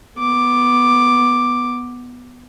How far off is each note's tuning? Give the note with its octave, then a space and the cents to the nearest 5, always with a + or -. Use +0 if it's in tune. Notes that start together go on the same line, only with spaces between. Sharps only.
B3 +0 D6 +5